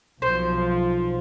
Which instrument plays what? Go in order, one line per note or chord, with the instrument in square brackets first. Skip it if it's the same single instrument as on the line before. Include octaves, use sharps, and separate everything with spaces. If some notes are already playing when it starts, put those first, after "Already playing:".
[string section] B1 F3 [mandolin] C5